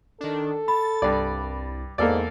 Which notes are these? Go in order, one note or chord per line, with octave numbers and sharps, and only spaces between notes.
D#3 D4 A4
B5 A6
C2 G2 D5
E2 G#2 A#3 A4 D5